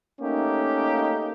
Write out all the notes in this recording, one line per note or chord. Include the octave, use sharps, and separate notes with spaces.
A3 A#3 C#4 D#4 G4